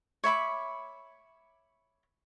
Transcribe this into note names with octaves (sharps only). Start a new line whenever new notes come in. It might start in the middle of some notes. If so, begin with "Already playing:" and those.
C#5 E5 B5 D6